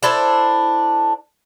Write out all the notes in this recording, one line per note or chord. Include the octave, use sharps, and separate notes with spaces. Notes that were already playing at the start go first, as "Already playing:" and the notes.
D4 E4 A4 C5